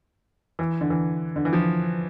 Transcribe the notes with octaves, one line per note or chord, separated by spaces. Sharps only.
E3
D3
E3
D3
E3
F3